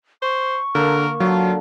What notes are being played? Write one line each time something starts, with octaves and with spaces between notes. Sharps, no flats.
C5 C#6
D3 A#3 A#4
D3 F#3 F4 F#4